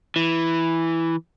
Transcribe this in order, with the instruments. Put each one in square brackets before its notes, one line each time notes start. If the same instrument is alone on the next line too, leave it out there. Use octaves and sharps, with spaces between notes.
[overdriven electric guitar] E3